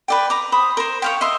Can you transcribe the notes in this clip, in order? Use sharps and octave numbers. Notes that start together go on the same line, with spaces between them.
B4 D5 G5
A#5 D6
C5 B5 D#6
A#4 C5
C#5 F5 G5
D#5 E5 C6